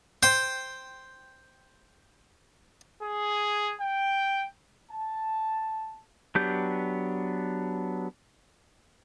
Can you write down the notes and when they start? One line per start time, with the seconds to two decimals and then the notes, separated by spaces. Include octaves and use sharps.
0.23 C5 G5
3.02 G#4
3.80 G5
4.91 A5
6.35 F#3 B3 D4 G4 G6